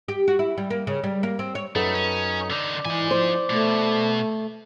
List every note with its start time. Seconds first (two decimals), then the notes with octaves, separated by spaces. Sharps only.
0.08 G4
0.28 F#4
0.39 E4
0.58 G3
0.70 A#3
0.87 C#3
1.04 G3
1.23 A#3
1.39 C4
1.55 C#5
1.75 F#2 A3 D#4 A4 B4
1.94 C#4
2.50 D3 D#4 D5
2.85 E3 D#4 G#5
3.11 F3 C5
3.50 B2 A3